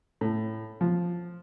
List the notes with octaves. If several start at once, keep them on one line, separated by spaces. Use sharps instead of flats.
A2
F3